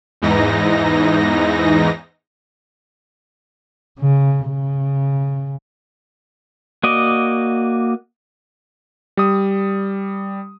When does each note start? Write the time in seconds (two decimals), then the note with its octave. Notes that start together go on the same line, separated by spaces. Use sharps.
0.22 E2 G#2 E3 D#4 A#6
3.99 C#3
4.47 C#3
6.83 A#3 F#4 D5 D#5
9.17 G3 D#6